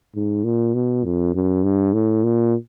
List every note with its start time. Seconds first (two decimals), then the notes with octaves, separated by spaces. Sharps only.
0.15 G#2
0.44 A#2
0.74 B2
1.04 F2
1.34 F#2
1.63 G2
1.93 A2
2.23 A#2